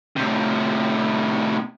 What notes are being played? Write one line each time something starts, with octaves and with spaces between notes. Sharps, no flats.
A2 C3